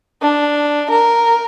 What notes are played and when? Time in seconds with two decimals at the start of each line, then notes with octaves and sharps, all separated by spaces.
0.22 D4
0.90 A#4